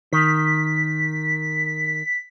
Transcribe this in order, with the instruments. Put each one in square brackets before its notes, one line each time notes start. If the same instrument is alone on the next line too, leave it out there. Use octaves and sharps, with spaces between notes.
[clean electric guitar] D#3 [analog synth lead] B6